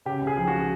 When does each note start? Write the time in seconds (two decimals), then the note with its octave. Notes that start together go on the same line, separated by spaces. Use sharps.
0.05 C#3 G4
0.21 C#2
0.27 G#4
0.37 F3
0.47 F#4